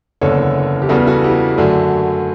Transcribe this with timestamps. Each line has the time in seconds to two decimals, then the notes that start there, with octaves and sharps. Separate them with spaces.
0.21 F#1 E2 D3 A4 C#5
0.82 G4
0.89 E2 C#3 G3 B3 F#4 A4
1.07 F#4 A4
1.24 E4 G4
1.58 F#2 D3 F#3 A3